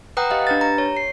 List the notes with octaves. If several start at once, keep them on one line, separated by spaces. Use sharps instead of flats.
B4 F#5 G5 A#5 D#6 F#6
G4 D#5 F5
D4 B4 A6
G4 A#5
C#5
C7